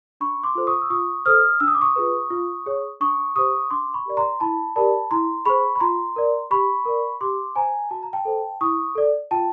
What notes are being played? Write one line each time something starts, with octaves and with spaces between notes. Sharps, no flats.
D4 B5 C#6
C6 D6
F4 A4 C5
C#6 D#6
E6
F4 C#6 D#6
A4 C5 D#6 F6
D4 E6
D#6
D6
C#6 D#6
F4 G#4 B4
F4
G#4 C#5
D4 C#6 D#6
G4 C5 C#6 D#6
D4 C6 D6
B5 C#6
G4 A#4 D5
A#5 C6
E4 A5 B5
G4 A#4 D5 A5 B5
E4 A#5 C6
G#4 C5 B5 C#6
B5
F4 A#5 C6
A#4 D5
G4 B5 C#6
A#4 D5
G4 C6 D6
C5 G#5 A#5
F#4 A5
A#5
G5 A5
A4 C5
E4 C#6 D#6
A4 D5
F4 G5 A5